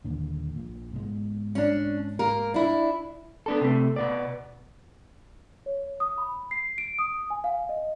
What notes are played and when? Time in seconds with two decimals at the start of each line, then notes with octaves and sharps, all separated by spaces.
0.05 D#2 A#2 D3
0.55 A#1 A#2
0.92 G#2 B2 G#3
1.55 C#4 D4
2.19 A#3 A#4
2.54 D4 E4
3.46 B3 D4 A4
3.61 C3 A3
3.96 B2 B3 D5
5.66 C#5
6.00 D#6
6.18 B5
6.51 C7
6.78 D7
6.99 D#6
7.30 G#5
7.44 F5
7.69 D#5